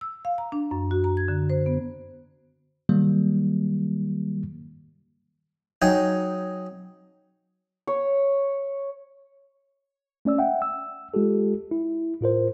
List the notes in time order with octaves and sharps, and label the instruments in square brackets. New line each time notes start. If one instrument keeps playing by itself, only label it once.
[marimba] E6
F5
A#5
D4
F#2
F#4
A#5
G#6
D3
C5
B3
[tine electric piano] D#3 F#3 G3 A#3
[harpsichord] F#3 D#4 G#4 G5 G#5
[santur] C#5
[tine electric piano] A3 C#4 D5 E6
E5 F#5 G5
E6
G#3 F4 G4 A4
E4
A2 F4 A#4 C5